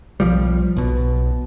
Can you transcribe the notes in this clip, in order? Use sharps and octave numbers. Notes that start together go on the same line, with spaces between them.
B1 F3 G3
B1 B2